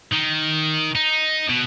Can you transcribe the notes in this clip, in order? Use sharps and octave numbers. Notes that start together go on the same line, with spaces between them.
D#3
D#4
B2